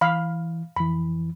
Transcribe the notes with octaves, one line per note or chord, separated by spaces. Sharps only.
E3 F5 B5
F2 E3 B5